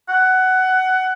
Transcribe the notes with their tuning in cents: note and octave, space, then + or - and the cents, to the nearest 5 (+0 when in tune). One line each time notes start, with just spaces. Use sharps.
F#5 +15